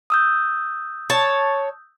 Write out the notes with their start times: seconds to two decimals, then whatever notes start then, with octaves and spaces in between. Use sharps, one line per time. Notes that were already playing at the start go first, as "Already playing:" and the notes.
0.10 D#6 E6 G6
1.10 C#5 A5